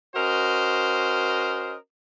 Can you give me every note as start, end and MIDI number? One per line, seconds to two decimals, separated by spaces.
0.16 1.76 61
0.16 1.76 66
0.16 1.76 70
0.16 1.76 72
0.16 1.76 75